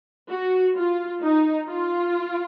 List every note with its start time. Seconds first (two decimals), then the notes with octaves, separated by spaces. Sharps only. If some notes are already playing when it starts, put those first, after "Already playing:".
0.30 F#4
0.76 F4
1.22 D#4
1.68 F4